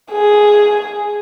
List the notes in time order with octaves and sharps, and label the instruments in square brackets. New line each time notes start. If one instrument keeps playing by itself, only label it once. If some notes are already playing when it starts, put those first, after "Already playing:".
[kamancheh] G#4